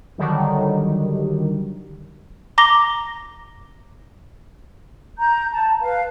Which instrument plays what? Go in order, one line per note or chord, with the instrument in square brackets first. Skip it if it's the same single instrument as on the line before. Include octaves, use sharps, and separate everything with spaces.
[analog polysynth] D3 D#3 F#3 G3
[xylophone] A#5 D6 A#6 G7
[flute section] A#5 G6
A5
B4 F5